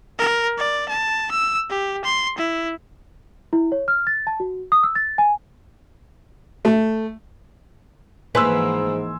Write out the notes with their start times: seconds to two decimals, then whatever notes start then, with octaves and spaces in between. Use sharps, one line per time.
0.18 A#4
0.58 D5
0.88 A5
1.31 E6
1.70 G4
2.04 C6
2.38 E4
3.53 E4
3.72 C#5
3.88 F6
4.07 A6
4.27 A5
4.40 F#4
4.72 D#6
4.83 E6
4.95 A6
5.18 G#5
6.65 A3
8.35 G#2 E3 F3 A#3 B4 G#5 C6 E6